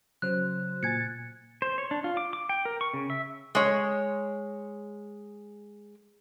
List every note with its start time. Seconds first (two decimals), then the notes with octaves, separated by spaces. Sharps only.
0.22 C#3 F#3 C5 F#6
0.83 A#2 G#5 G#6 A6 C#7
1.62 C5
1.78 C#5
1.91 D4
2.04 F4
2.17 D6
2.33 D6
2.49 G5
2.65 A#4
2.81 C#6
2.94 C#3
3.10 E5
3.55 G#3 C#5